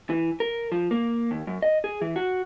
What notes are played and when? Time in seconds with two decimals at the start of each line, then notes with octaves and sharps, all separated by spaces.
0.10 E3
0.40 A#4
0.72 F3
0.91 A#3
1.31 D#2
1.47 F#2
1.62 D#5
1.84 G#4
2.02 E3
2.16 F#4